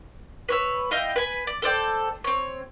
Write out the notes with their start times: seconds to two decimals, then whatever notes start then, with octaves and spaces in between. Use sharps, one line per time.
0.49 B4 C#5 E6
0.91 E4 D#5 F5 G5
1.16 B4 G#5 B5
1.47 D5
1.62 A4 C5 D5 G5
2.24 C4 C#5